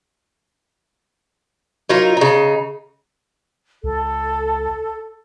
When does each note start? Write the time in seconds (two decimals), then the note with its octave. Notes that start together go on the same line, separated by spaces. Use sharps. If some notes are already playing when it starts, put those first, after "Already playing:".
1.89 F#3 D#4 F4 A#4
2.17 C#3 D#4
3.83 C#2 A4